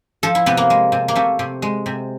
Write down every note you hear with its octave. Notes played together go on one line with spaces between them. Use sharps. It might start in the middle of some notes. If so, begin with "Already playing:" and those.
F3 A4
E4
C3 B3
A#3
G#3
C3
A#3
C3 A3
C3
G#3
C3